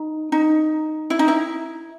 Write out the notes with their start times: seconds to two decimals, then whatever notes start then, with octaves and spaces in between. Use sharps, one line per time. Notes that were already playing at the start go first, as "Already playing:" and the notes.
Already playing: D#4
0.32 D#4
1.10 E4
1.19 D#4
1.28 E4